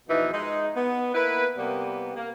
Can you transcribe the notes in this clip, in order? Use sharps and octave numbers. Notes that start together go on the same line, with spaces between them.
E2 B2 E3 F3 D#4
G#3 D#4
B3
A#3 E4 B4
C3 G3 A#3 B3
A#3